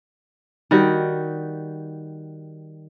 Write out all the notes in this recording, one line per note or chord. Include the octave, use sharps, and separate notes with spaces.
D#3 G3 F#4